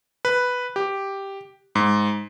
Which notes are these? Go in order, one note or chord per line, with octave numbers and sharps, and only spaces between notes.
B4
G4
G#2